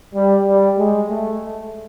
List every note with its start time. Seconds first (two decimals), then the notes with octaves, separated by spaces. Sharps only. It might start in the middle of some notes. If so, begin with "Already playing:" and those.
0.15 G3
0.46 G3
0.78 G#3
1.09 A3